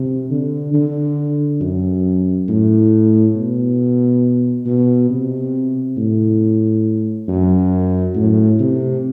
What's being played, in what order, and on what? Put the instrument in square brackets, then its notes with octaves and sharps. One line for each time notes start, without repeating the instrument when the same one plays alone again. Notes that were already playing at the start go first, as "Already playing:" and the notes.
Already playing: [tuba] C3
D3
D3
F#2
A2
B2
B2
C3
A2
F#2
A2
C3